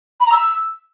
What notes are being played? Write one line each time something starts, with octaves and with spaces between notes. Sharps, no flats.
B5
A#5
E6